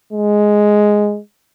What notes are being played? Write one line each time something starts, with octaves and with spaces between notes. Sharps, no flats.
G#3